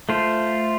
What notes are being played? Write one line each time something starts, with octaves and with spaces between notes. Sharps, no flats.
A3 F4 C5